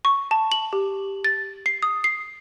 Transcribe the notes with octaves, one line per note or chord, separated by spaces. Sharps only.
C#6
A5
F#7
G4
A6
C7
D#6
C7